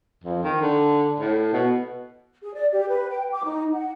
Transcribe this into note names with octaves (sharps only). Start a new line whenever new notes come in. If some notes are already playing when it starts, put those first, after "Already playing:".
F2
D#3
D3
A2
B2
G#4
D5
G4
B4
G5
D6
D#4
F#5